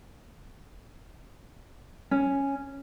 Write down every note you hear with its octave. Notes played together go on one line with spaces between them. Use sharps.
C#4